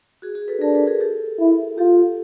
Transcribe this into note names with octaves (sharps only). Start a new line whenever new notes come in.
F#4 G#4
F#4 G#4
A4 B4
D4 G#4 A#4
A4 B4
G#4 A#4
G4 A4
E4
F4 G4 A4